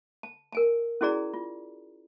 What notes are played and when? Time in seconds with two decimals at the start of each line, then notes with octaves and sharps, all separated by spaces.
0.23 A5
0.52 A#4 G#5 A5
1.01 C#4 E4 F#4 G#4 D5 A#5
1.34 F4